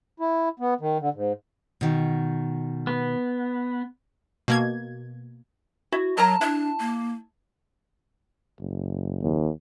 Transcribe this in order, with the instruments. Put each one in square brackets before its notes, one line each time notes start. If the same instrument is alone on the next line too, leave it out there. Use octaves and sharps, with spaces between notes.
[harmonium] E4
B3
D#3
D3
G#2
[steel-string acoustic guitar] B2 D#3
[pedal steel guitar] B3
[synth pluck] B2 A#3 G#6
[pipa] E4 [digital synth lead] F#4
[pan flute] F#3 [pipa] A#4 A#5 [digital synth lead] A5
[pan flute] D4 [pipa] E4
[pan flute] A#3
[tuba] F#1
[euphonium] D#2